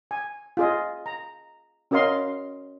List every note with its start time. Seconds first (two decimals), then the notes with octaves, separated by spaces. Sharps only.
0.11 G#5
0.57 F4 G#4 D#5
1.06 A#5
1.91 C#4 F#4 A#4 D#5 F5 C6